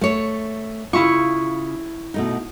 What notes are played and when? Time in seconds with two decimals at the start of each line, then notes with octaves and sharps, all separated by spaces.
0.01 A3 C#5
0.93 C#3 E4 F4 C#6
2.14 B2 A3 D#4